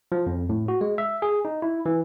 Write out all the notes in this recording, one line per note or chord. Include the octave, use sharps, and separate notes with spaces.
F3
F2
A2
F#4
G#3
E5
G#4
D#4
E4
E3